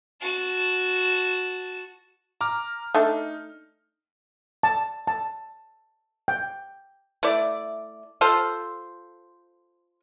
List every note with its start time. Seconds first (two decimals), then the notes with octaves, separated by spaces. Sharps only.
0.21 F#4 A5
2.41 A#5 D6 F6
2.95 A3 D4 D#4 A4
4.63 A5
5.07 A5
6.28 G5
7.23 A3 E4 D5
8.21 F4 A4 C5